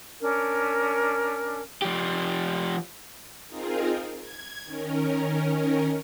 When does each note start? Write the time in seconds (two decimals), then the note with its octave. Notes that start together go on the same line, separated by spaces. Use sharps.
0.21 C#4 D4 A#4
1.82 F3 G4
3.46 C4 D#4 F4 G#4 A#4
4.18 G#6
4.65 D#3 C#4 A#4